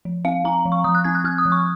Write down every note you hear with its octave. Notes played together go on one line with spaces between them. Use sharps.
F3
C4 F5
C4 A#5
F3
C#6
F3 D#6
F#6
C4 G#6
F#6
C4 F6
D#6
F3
C#6